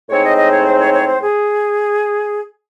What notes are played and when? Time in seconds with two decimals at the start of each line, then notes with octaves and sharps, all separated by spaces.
0.09 A2 G#3 C4 D#4 C#5
0.23 D#5
0.37 D#5
0.52 C#5
0.66 C5
0.79 C#5
0.94 C#5
1.07 C5
1.22 G#4